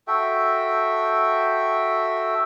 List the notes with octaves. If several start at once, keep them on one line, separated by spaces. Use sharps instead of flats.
F#4 A4 E5 G5